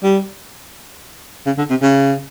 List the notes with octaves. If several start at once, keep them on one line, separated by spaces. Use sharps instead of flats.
G3
C#3
D3
C3
C#3